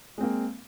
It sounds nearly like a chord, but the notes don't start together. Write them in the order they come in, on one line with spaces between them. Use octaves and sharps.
G#3 C4 A#3